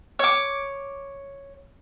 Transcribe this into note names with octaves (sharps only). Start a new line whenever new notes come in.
C#5 D6